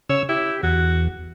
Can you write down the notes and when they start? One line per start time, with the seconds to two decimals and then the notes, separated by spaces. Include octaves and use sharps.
0.09 C#3 C#5 E6
0.29 E4 G4
0.63 E2 F#4